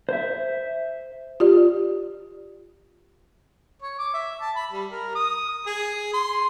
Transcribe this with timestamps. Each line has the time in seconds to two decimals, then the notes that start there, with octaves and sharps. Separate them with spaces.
0.09 C5 E5
1.40 F4 G4 D5
3.82 C#5
3.99 D6
4.14 E5
4.41 A5
4.56 B5
4.72 G3
4.91 A#4
5.15 D#6
5.66 G#4
6.13 C6